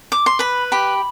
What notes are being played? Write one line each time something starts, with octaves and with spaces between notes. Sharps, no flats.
D6
C6
B4 B5
G4 B5